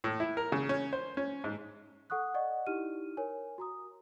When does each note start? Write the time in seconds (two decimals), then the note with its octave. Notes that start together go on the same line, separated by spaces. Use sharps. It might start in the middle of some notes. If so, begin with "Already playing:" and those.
0.04 A2
0.20 E4
0.37 A#4
0.52 C#3
0.69 C#4
0.93 C5
1.17 C#4
1.44 G#2
2.10 A4 F#5 C#6 D#6 F#6
2.34 D5 D#5 F#5 C#6
2.67 D#4 E4 G4 F6 D#7
3.17 A#4 C#5 G#5
3.58 F#4 A#5 D#6